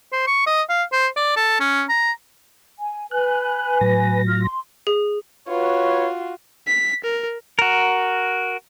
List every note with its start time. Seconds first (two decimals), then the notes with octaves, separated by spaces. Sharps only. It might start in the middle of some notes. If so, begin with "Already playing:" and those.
0.13 C5
0.27 C#6
0.47 D#5
0.70 F5
0.92 C5
1.17 D5
1.36 A4
1.60 C#4
1.89 A#5
2.79 G#5
3.11 B4 G#5 F#6
3.81 A2 F#3 A#6
4.26 F4 F6
4.43 C6
4.87 G#4
5.48 F4 F#4 B4 C#5
6.67 B6
7.04 A#4
7.59 F#4 A#4